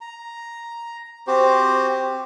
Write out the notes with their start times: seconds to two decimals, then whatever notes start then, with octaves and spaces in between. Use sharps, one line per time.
0.01 A#5
1.27 C4 F#4 G4 C5